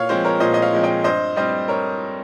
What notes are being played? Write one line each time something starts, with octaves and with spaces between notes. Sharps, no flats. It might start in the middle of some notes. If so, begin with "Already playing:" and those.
Already playing: A#2 C#5 F5
F3 G#3 C4 C5
A#4 C#5
A#2 C5 D#5
D#5
C#5 F5
F3 G#3 C4
D#5 G5
G2 C5 D#5
G3 C4 C5 D#5
A#4 C#5